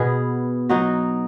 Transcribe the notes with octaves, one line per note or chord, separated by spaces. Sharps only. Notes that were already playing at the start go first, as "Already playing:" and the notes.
Already playing: B2 B3 G#4
F#3 D#4 F#4